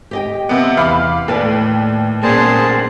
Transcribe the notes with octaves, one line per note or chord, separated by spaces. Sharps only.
G4 D#5 G5
C3 B3
E2 F5 B5 D6
D#2 A2 A4 B4 D5
A#2 A#3 B3 C#4 G#4 C5 A5